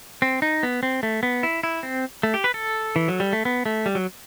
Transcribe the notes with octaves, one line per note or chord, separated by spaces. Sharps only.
C4
D#4
B3
C4
A3
B3
E4
E4
C4
A3
G4
B4
A4
E3
F#3
G3
A3
B3
A3
G3
F#3